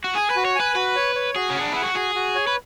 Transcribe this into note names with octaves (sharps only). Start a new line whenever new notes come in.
F#4
G#4 G#5
B4
F#4
C#5
B4 G#5
F#4 B4
C#5
C#5
F#4 G#4
C#4 F#5
D4
E4 F#5
F#4
F#4 G#4
F#4
C#5
B4